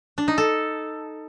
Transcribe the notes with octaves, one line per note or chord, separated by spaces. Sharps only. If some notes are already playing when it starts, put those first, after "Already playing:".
D4
D#4
A4